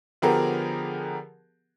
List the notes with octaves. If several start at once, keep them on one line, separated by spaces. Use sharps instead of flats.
D3 F3 B3 G4 G#4 A#4